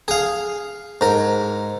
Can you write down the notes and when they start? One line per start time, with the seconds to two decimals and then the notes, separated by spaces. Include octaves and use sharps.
0.08 G#4 F5
1.01 G#2 A#4